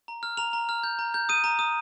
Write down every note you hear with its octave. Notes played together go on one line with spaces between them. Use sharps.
A#5
F6
A#5 F7
A#5
F6
G6
A#5
G6
D#6 D#7
A#5
D#6